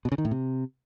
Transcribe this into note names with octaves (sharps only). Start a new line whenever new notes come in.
B2
C#3
D#3
A2
C3